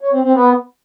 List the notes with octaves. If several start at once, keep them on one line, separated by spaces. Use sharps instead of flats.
C#5
C4
C4
B3